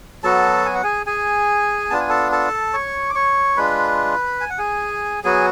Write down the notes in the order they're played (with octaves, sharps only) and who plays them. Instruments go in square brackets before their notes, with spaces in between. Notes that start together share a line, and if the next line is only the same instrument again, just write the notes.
[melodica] F#3 B3 F#4 A4 A5
G#5
F#5
G#4 G#5
G#4 G#5
B3 D4 F4 A5
G#5
A4 A5
A4 A5
C#5 C#6
D6
C#5 C#6
G#3 D4 F4 B4 B5
G#5
F#5
G#4 G#5
F#3 B3 F#4 G#4 G#5